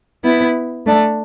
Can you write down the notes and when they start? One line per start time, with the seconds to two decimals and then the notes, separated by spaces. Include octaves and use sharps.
0.23 B3 E4
0.86 A3 D4